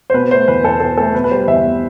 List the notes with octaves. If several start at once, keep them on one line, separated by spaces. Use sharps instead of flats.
C5
B2 B4
A3 C5
E2 B4
E2 A4
B2 A4
A3 A4
B2 B4
B4
G3 C5
E2 E5
B3